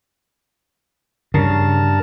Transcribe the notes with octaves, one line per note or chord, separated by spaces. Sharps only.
G2 C#3 A#4 A5